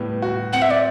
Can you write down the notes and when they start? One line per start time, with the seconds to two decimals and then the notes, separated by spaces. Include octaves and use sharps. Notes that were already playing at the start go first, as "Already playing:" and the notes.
Already playing: A2 G3 B3
0.22 F#4
0.53 C4 F#5
0.62 E5
0.71 D5